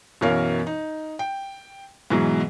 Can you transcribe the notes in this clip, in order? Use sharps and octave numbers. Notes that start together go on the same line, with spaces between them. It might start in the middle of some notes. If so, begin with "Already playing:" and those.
F#2 B2 E3 A#4 C#5 F5
D#4
G5
G#2 B2 E3 F#3